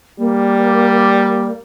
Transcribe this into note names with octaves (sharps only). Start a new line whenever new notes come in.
G3 A#3